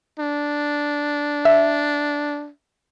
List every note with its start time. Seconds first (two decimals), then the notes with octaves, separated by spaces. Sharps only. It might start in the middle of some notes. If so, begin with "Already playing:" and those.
0.19 D4
1.45 E5